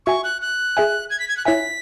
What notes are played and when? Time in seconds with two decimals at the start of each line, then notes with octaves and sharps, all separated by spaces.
0.06 F#4 E5 G#5 C#6
0.24 F#6
0.42 F#6
0.77 G#4 E5 G#5
1.10 G#6
1.20 B6
1.28 G#6
1.37 F#6
1.45 E4 C#5 E5 G#5 B6